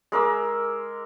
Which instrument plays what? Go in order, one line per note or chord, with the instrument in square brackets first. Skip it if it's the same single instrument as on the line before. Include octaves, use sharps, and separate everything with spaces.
[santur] G#3 A#4 D6 E6